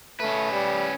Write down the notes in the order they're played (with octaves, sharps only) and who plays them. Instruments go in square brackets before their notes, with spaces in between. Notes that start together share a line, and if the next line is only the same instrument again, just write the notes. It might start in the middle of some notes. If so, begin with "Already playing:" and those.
[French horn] A3 [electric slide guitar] C#4 B4
[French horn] G3